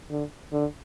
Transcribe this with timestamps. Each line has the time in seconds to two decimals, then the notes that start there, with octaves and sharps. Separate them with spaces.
0.11 D3
0.53 D3